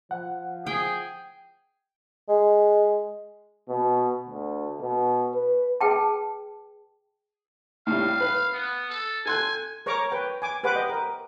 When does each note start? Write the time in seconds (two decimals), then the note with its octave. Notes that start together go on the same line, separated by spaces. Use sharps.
0.11 F3 F#5
0.67 G#4 G5
2.28 G#3
3.68 B2
4.27 D2
4.81 B2
5.34 B4
5.81 G#4 B4 G5 A5
7.87 A2 G3 F5
8.20 B4
8.53 B3
8.90 A4
9.26 A4 G#5 C6 F#6
9.86 A#4 C#5 A#5 C#6 D6
10.12 B4 G5
10.42 G#5 D6
10.63 G4 B4 C5 F#5 G5 D6
10.75 D#5
10.89 A#4